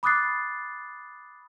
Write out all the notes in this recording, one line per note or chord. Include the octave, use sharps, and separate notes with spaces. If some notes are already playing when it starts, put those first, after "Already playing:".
B5 D6 D#6 F#6 A6 C7